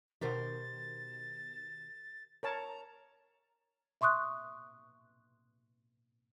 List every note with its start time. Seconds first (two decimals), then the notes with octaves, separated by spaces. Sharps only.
0.21 B2 D#3 G4 A#4 C5 A6
2.43 A#4 C#5 A5 A#5
4.01 E5 C6 C#6 D#6 F#6